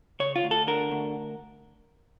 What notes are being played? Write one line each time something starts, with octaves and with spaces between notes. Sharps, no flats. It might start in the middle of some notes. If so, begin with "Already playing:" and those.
C#3 C#5
F4
D2
A4
D3 A#4
D2